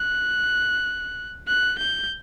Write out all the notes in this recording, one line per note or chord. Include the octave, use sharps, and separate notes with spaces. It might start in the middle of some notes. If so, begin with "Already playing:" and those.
Already playing: F#6
F#6
G6